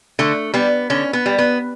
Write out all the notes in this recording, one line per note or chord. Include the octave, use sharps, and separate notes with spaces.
D3 A3
G3 B3
D3 C#4
B3
G3
B3